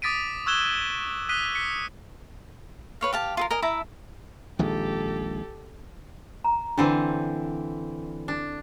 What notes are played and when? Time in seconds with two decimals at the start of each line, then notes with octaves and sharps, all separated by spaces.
0.02 D6 D#6 A6 B6 D7 D#7
0.46 C#6 E6 F#6 G#6 E7 G7
1.29 D#6 F#6 B6 D#7 G7
1.55 B6 C#7
3.01 B4 C#5 F5
3.13 G4 F5 A5
3.37 F4 G#4 A#4
3.51 A#4 D#5 G#5
3.62 E4 E5 A5 A#5
4.59 A#1 D#3 G#3 G4 A4
6.44 A#5
6.78 D3 E3 C4 D4
8.28 D4